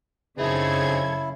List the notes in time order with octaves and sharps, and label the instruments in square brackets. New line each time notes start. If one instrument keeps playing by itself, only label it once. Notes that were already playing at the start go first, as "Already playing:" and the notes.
[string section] F#2 A4 G#6 [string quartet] C#3 [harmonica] C4 D#4 G#4 [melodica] E4